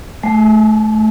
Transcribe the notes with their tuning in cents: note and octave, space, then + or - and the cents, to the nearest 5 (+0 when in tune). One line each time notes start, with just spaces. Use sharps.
A3 -25 G#5 +25